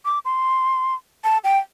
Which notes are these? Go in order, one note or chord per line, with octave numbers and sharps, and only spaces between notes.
D6
C6
A5
G5